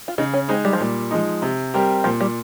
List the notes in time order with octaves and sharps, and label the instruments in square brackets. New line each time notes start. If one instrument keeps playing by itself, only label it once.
[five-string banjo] F4
[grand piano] C#3 [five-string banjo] D#4
[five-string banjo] C#4
[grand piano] G#3 D#4 [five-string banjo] C4
[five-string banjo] G3
F3
[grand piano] A#2 [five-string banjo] G3
[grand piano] F3 G#3 D#4
C3
G3 C4 G4 A#4
[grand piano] A#2 [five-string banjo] F3
[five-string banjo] G3